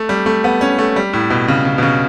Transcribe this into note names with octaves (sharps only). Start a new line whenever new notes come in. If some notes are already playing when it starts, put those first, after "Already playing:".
Already playing: A3
G3
A3
B3
C#4
A3
G3
A2
B2
C#3
C#3
B2
C#3